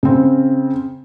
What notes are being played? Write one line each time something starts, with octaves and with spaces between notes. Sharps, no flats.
C#3 C4